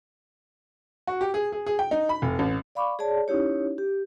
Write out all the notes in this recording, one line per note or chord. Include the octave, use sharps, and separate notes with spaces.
F#4
G4
G#4
G#4
G#4
G5
D#4
B5
F1
A1
D5 F5 B5 C#6 D6
G#4 C#5 D5 A5
C#4 D#4 E4 G4 C#5
G4